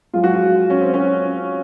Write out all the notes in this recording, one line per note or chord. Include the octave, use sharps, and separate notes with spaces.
F#2 F3 G#3 F4
F#4
F4
C#4
C4
C#4